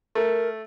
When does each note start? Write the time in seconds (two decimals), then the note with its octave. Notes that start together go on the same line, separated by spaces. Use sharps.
0.15 A3 A#4